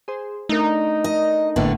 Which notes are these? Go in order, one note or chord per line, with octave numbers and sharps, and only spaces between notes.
G#4 C5
A3 D4 D#4 A#4
D#5
G#1 A2 D3 A#3 B3